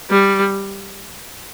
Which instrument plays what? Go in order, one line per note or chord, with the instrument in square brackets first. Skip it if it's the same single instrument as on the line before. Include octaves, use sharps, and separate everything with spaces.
[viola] G3